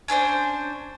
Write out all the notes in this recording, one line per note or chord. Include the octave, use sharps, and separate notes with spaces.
C#4 D4 B4 C5